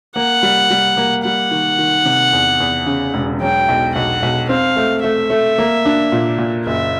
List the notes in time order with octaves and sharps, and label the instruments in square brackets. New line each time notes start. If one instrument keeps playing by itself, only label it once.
[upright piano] A#3 [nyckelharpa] F#5
[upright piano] G3
G3
A#3
[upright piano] G3 [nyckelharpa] F#5
[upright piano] D#3
D#3
C3
E2
E2
C#3
E1
[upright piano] F#3 [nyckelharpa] G5
[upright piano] B1
[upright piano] B1 [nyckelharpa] F#5
[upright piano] B1
[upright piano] C4 [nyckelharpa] F5
[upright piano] A3
[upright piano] A3 [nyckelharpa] E5
[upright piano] A3
A#3
D4
A#2
A#2
[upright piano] F#1 [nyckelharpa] E5